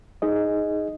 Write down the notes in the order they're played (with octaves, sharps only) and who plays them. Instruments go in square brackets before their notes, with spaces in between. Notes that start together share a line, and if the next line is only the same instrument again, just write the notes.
[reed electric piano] D#4 G#4 D#5